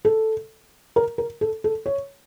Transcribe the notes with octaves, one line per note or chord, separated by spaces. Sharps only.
A4
A#4
A#4
A4
A4
C#5